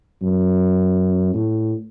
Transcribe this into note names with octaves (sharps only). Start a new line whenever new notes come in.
F#2
A2